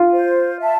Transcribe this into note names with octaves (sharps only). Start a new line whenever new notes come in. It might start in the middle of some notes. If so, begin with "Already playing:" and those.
Already playing: F4
C5
E5 A5